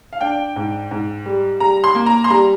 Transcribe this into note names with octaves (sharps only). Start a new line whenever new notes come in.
F5
D4 G5
G#2
G#2
G3
G3 A#5
C6
A#3
A#5
C6
G3 A#5